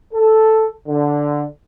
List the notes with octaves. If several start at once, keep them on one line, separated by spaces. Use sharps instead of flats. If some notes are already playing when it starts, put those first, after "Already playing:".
A4
D3